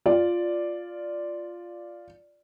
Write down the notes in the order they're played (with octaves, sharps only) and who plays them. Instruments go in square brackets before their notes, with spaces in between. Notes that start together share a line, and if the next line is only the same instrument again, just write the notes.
[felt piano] F4 D5